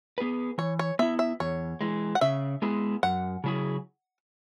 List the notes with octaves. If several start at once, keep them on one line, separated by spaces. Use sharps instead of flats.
B3 G#4 B4
E3 C#5
C#5
B3 E4 E5
E5
E2 C#5
E3 G#3
F#5
C#3 E5
G#3 B3 E4 G#4
F#2 F#5
C#3 F#3 E4 G#4